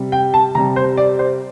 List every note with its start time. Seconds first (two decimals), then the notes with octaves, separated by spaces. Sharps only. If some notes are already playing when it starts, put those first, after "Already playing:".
Already playing: C3 G3
0.12 G5
0.34 A5
0.55 C3 G3 A#5
0.76 C5
0.97 D5
1.19 C5